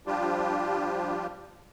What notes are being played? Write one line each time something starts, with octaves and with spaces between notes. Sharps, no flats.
F3 G3 D4 F4 G4